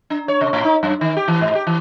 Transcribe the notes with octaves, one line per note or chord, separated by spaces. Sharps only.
D4
C#5
C3
A2
D#4
F#2
D#3
G4
E3
G#2
G4
E3